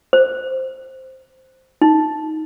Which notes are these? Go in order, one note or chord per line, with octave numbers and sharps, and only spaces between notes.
C5
D#4